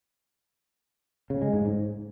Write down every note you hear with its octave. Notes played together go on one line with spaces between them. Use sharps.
C#3
G#3
G#2
G#2